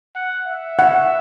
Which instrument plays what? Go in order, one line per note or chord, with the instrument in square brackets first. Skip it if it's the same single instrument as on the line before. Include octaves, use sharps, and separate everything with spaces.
[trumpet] F#5
E5
[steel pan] F#5